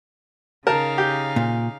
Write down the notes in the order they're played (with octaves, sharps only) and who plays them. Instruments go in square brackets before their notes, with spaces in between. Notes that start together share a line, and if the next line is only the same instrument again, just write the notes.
[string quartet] C#3 D#4 F5 [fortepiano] A#4 A5
[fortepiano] G4
[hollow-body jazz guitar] A#2